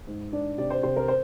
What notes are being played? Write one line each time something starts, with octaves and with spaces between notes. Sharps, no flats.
G#2
D4 D5
C3 D5
C5
C3 C5
A#4
C5